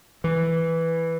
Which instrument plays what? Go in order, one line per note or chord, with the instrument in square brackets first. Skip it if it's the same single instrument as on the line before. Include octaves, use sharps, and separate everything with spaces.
[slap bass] E3